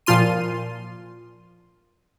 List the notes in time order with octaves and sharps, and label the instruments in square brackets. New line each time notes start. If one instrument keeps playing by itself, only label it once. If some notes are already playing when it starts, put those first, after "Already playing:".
[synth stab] A#2 F3 F4 C6 D#7